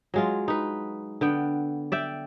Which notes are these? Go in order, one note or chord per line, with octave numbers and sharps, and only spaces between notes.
F#3 G#3 F4
D#4 B4
D3 B3 G5
D5 E5 G5